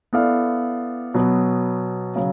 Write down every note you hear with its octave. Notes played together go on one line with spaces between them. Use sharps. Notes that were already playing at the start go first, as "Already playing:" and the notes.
B3 E4 A4 D5 F5
B2 F#3 B3
C#3 F#3